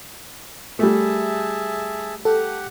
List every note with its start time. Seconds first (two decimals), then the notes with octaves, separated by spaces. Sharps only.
0.79 G3 A3 G#4 E5 A5
2.25 G4 A4 F#5